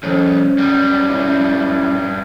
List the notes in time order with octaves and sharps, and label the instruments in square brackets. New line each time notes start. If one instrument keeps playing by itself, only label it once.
[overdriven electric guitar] C2 F2 [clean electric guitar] C#4
[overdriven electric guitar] F#2 G3
[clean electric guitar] C#4 E4 F4